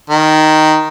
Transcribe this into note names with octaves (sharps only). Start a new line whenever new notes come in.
D#3